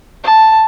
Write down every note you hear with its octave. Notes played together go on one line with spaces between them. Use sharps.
A5